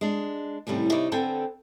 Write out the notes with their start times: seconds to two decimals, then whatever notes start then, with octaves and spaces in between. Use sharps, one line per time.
0.01 G#3 D4
0.67 D#2 A2 C3 G3 C#4
0.92 C3 D#4 E4 C#5 D5
1.12 D3 B3 C4 A4 G5 G#5